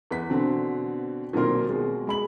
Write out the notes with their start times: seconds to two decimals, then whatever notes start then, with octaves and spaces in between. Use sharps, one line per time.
0.11 E2 B4 B6
0.30 B2 D3 C4
1.33 B1 A#2 D#3 C4 A#4 C6
1.69 B2 G#3
2.07 G#3 B5 F#7